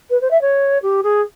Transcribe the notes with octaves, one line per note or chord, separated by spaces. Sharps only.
B4
C5
E5
C#5
G4
G#4